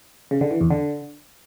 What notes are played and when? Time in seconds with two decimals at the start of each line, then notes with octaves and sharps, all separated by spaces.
0.31 C#3
0.41 D3
0.51 E3
0.61 E2
0.70 D3